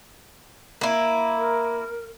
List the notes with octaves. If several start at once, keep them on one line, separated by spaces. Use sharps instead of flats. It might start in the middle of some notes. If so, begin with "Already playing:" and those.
A#3 E4
A#4